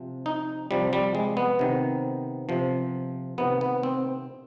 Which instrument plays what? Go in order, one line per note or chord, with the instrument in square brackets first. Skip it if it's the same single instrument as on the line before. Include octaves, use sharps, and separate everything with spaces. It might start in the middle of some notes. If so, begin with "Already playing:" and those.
Already playing: [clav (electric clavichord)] C3 F3
D#4
C3 F3 G3
G3
G#3
B3
C3 D#3
C3 F3
C3 D#3 B3
B3
C4